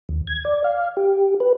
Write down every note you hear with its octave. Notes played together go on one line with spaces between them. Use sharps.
D#2
G#6
D5
F5
G4
B4